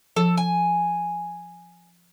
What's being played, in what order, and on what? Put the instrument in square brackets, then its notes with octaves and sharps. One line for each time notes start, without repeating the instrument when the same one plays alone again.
[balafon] F3 [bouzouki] A4
[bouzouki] G#5